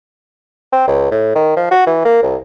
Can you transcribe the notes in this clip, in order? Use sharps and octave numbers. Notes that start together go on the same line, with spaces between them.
C4
C#2
A2
D#3
F3
F#4
E3
A#3
C2